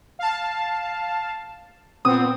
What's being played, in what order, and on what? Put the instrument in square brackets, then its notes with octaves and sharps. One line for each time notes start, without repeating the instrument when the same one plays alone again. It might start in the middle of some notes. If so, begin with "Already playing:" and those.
[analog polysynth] F5 A5
[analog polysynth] A#2 B3 C4 [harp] D#6